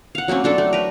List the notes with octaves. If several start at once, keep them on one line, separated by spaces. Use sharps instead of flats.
F5 F#5
F#3 A#3 C4 C#4
F#3 D4 A4
A3
A#4 B4